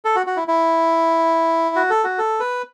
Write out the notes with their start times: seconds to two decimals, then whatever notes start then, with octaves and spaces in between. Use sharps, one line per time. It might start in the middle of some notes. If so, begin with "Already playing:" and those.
0.05 A4
0.16 F#4
0.26 F#4
0.37 E4
0.48 E4
1.76 F#4
1.90 A4
2.04 F#4
2.18 A4
2.40 B4